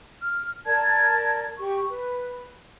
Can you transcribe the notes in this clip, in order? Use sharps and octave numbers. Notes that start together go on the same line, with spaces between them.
F6
A#4 D5 A5 G#6
G4 C#6
B4